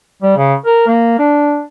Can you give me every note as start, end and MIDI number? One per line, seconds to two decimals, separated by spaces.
0.23 0.34 55
0.37 0.54 49
0.66 0.85 70
0.87 1.14 58
1.19 1.62 62